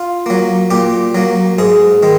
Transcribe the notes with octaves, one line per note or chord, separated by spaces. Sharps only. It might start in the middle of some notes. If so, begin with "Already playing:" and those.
Already playing: F4
F#3 A#3
A#2 G4
F#3 A#3
G#2 G#4
D#3 G#3